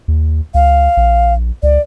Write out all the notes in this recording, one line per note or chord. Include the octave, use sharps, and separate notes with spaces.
D#2
C#2 F5
A#1
C#2 D5